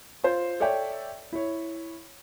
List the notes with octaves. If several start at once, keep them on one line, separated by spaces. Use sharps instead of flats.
F4 C5
A4 C#5 D5 E5 G5
E4 C#5